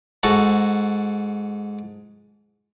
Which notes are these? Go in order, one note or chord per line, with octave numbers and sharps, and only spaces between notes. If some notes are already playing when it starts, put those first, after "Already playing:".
G#2 F#4 A4